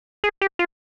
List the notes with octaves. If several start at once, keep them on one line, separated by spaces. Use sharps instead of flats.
G#4
G4
F4